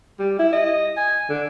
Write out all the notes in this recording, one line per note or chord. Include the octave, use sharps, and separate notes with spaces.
G3
E4
D#5
G#5
D3